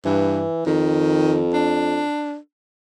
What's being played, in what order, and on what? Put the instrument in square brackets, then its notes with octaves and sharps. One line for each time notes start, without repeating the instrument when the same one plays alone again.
[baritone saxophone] G2 [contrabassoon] E3
[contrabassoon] F2 [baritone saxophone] D#3
[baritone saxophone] D4